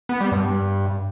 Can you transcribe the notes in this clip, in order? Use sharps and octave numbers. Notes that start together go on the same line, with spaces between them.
B3
G3
G2